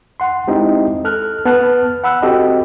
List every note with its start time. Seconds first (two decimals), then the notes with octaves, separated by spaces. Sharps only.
0.20 F#5 C6
0.47 G#3 C4 D#4 E4 G4 D#5
1.05 A4 F6 F#6
1.45 B3 A5 F6 F#6
2.04 F#5 B5 E6 F#6
2.22 C4 F#4 G4 A4 D#5